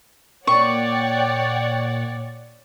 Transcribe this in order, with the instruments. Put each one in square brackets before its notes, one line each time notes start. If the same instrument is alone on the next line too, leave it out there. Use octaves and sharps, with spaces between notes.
[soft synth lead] A#2 [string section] C#5 D5 F#5 [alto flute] G5 [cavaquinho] C#6